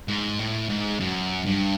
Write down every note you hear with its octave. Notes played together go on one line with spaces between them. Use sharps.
G#2
A2
G#2
F#2
G2